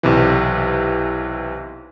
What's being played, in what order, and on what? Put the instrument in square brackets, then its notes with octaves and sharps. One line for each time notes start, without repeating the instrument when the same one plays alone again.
[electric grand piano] B1 C3 E3